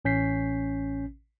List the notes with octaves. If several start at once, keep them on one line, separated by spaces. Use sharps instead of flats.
A1 C#4 G6 B6 C7